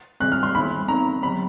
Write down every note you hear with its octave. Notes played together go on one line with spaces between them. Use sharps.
D#3 G3 C4 F#6
F6
C6
D#3 G3 B3 D#4 B5
G#3 C4 D#4 A#5
D3 F#3 B3 B5